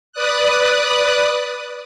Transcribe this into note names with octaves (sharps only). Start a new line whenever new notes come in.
B4 D5 D#6 F#6